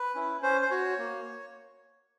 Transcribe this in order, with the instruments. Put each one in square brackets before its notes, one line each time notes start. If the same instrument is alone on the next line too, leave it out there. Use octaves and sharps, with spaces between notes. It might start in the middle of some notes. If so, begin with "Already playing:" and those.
Already playing: [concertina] B4
C#4 E4
C#4 C5
C5
F#4 C#5
A#3